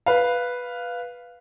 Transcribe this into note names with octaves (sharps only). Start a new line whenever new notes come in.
B4 F5